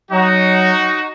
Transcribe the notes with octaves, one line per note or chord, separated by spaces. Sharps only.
F#3 D#4 F#4